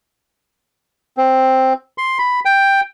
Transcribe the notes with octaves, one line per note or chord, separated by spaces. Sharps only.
C4
C6
B5
G5